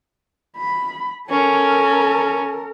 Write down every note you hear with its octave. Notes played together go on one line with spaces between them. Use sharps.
B5
C#4 A4 A#4